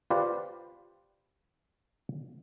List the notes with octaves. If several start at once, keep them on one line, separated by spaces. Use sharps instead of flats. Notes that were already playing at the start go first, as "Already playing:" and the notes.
F4 G4 B4 C5 D5